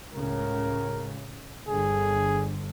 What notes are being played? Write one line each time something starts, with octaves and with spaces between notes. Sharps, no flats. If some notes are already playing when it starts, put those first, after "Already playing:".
C#2 A2 C#3 A#4
G1 D3 G#4